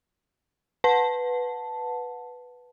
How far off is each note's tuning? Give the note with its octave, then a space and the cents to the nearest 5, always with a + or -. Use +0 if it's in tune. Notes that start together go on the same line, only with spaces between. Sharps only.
B4 +0 F#5 -25 A5 +0